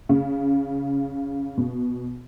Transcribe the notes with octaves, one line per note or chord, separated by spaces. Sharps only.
C#3
B2